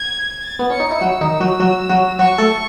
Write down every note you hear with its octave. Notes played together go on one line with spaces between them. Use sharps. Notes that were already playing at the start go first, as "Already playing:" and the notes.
Already playing: G#6
A6
B3
C#4 C#7
D#4
E4
F#3 F#4 E6
D#3 D#4
F#3 F#4
F#3 F#4
F#3 F#4
F#3 F#4 C#6
A3 A4